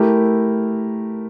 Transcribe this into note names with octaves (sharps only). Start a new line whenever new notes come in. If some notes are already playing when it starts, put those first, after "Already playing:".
Already playing: A3 E4 G4 A#4